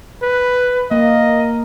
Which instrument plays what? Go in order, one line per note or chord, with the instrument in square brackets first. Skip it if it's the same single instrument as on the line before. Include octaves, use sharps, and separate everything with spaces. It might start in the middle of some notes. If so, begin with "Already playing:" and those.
[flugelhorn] B4
[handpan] A#3 [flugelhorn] D#5